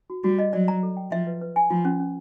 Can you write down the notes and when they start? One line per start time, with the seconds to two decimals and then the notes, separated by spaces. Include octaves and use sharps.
0.10 F#4
0.24 G3 F#4
0.39 D#5
0.53 F#3 D5
0.68 A#5
0.83 A4
0.97 G5
1.11 F3 E5
1.27 B4
1.41 B4
1.56 G#5
1.70 F3 F4
1.85 C#4
2.00 C#4